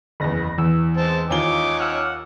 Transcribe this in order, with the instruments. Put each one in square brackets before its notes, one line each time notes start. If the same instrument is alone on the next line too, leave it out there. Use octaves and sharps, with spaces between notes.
[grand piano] F#1 E2 [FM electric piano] B5 A#6
[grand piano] E2 [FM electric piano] E3 E6
[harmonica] G#3 C4 [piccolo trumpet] A5
[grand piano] D#2 F4 G7 [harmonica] D#4 C#5 G#5 [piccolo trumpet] D6
[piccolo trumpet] F#5 [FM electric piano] D6 E6 F6